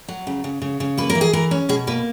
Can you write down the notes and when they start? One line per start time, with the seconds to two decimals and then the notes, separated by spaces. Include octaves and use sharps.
0.08 F#3
0.27 C#3
0.44 C#3
0.62 C#3
0.80 C#3
0.97 A#3 B4
1.10 A#4
1.15 E3
1.21 G#4
1.33 E3 A#4
1.51 C#4
1.69 B2 G#4
1.87 A#3 B4